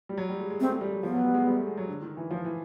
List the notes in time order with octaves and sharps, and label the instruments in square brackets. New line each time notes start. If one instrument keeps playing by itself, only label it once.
[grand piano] G3
F#3
G3
G#3
G#3
[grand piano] A3 [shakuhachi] C4
[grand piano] G#3
G3
F#3
[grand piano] F3 [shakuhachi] B3
[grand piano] F#3
G3
G#3
G3
A3
G#3
F#3
D3
D#3
E3
F3
E3